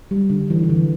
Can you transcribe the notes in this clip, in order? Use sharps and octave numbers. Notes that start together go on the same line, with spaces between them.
G3
D3
E3
E3
D3